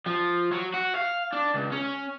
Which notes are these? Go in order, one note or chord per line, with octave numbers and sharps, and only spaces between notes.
F3
F#3
F#4
F5
D4
C#2
C#4